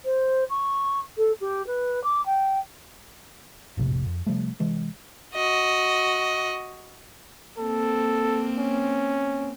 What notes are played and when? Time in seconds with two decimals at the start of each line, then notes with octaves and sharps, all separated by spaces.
0.05 C5
0.50 C#6
1.17 A4
1.41 G4
1.67 B4
2.03 D6
2.26 G5
3.77 F1 A#1 A2 C3
4.05 F2
4.27 C3 F3 G3 A3
4.60 C3 E3 G#3
5.34 F#4 D#5
7.58 A#3 C4 A4
8.57 C#4